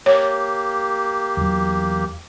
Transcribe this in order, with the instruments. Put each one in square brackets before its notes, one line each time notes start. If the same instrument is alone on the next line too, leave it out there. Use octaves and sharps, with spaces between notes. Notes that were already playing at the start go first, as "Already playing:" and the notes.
[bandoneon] A#3 G4 [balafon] C#5
[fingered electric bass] E2 E3 F#3